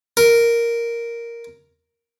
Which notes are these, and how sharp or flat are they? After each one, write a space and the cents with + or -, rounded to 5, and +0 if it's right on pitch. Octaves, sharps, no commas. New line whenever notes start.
A#4 +0